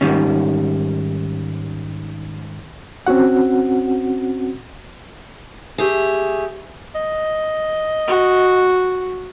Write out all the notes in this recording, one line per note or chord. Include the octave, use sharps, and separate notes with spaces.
G#2 D#3 G3 C#4
C4 C#4 F#4 F#5
A3 G4 G#4
D#5
F#4